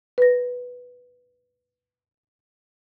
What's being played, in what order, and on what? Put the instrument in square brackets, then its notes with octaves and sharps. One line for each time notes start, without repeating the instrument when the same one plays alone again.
[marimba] B4 A#6